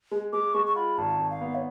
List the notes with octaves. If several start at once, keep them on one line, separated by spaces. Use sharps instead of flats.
G#3
G#3 D6
G#3 C#6
C#6
F4 B5
G#1 A5
G#1
F5
B3
C#5